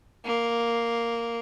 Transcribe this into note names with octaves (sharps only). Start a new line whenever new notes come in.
A#3